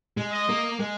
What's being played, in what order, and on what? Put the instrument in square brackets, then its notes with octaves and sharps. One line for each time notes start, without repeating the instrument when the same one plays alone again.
[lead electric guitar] G#3
[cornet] D#5
[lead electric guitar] A#3
G#3